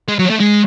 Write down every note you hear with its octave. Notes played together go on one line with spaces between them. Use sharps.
G#3
F#3
A3
G#3